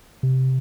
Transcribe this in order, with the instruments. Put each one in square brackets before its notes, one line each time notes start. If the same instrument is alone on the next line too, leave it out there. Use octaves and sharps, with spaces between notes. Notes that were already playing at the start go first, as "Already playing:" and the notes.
[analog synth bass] C3